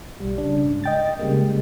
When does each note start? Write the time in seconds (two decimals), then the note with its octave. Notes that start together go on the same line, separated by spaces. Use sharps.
0.19 B1 G3
0.38 C#3 D4
0.64 G#2
0.84 D#5 G5 A6
1.19 C#3 G3 G#3 A#3